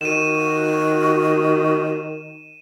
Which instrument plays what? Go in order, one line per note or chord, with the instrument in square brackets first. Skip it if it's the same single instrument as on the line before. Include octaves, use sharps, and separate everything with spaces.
[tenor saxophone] D#3 [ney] F#4 [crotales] D#7 E7